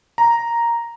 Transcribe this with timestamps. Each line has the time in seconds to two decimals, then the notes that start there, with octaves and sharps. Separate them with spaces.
0.18 A#5